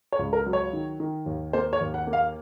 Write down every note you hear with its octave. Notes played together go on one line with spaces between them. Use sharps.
C#5
C#2
A#4
F#3
C#5
D#3
D#3
D#2
A#3 C5
C#5
D#2
F#5
A#3
F5